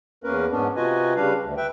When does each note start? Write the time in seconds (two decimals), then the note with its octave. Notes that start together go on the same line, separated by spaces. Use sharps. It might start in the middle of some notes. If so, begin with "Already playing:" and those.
0.24 E2 A#3 C#4 A#4 B4
0.51 G#2 B3 C#4 D4
0.76 C3 F4 F#4 B4 D#5 G#5
1.16 C#3 G3 D4 B4 F5
1.43 D2
1.57 B4 E5 G5